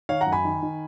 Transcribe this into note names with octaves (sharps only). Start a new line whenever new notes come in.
D#3 C#5 F5
F#5 A#5
F#2
G#5 B5
D#3
D#3